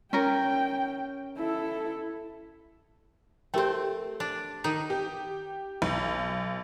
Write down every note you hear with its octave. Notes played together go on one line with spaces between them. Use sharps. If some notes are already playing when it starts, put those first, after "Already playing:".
C#4 A#4 G5
E4 A4
A3 C4 G4 A#4 G5
D4
D#3 D#4
G4
B1